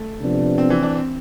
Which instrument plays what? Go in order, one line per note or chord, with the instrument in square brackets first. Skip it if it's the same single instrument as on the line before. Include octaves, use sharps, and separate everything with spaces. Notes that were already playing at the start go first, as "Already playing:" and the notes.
Already playing: [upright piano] A3
[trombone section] C3 F3 B3 D4
[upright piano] C4
E3
D4
C4